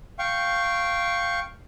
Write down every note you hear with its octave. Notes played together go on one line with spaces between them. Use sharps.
F5 G5 C#6